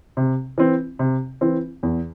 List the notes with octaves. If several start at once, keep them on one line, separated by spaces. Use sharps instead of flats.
C3
E3 C4
C3
E3 C4
E2